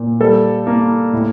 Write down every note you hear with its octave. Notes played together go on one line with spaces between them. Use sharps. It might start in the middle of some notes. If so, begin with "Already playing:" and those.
Already playing: A#2
G3 A4
A#3
A2